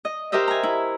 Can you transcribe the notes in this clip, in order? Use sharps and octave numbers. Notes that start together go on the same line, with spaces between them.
D#5
G4 A#4 C5 D#5 E5
G#5 A#5
E4